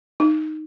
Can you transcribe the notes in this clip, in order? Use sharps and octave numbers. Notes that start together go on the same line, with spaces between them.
D#4